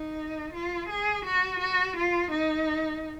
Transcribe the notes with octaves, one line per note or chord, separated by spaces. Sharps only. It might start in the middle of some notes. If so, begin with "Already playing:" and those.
Already playing: D#4
F4
G#4
F#4
F#4
F4
D#4